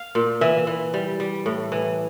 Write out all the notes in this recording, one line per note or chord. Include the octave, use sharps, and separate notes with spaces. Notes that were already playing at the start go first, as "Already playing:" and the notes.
Already playing: F5
A#2
E3 E5
E3
G3
G3
A2
E3